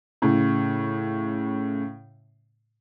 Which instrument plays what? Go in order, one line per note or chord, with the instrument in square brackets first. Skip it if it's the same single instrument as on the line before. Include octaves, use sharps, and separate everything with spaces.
[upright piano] A2 C#3